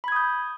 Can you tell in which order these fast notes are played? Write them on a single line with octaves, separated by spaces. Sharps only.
B5 G#6 D#6 G6